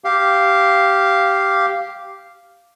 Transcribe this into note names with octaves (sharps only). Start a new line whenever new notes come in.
G4 F5